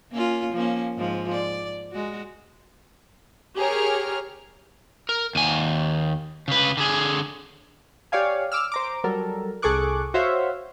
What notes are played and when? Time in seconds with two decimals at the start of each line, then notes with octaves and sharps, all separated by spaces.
0.12 A#3 C#4 F4
0.53 F3 A#3 C#4
0.97 G#2 F3
1.32 D5
1.92 G#3 F#4
3.56 G4 G#4 A#4 C#5 F6
5.09 A#4
5.35 D#2 G#5
6.48 C#3 B4
6.77 D3 G#4
8.12 G4 C#5 D5 F5 G#5
8.52 D6 E6 F6
8.72 C5 A#5 D6
9.04 F#3 G3 A4 A#4
9.62 C2 G#4 A4 C#6 D6 F#6
10.14 F#4 C5 C#5 E5 F5